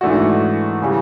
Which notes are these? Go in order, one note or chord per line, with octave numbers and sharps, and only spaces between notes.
G#2 E3 A3 D4 F#4
C#3 E3 G3